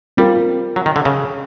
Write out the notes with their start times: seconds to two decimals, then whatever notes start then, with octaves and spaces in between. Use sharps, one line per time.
0.17 G3 C4 F4 A#4
0.76 F#3
0.86 D#3
0.96 D3
1.05 C#3